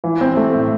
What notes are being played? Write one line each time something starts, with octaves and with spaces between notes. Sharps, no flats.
E3
C4
A3
A2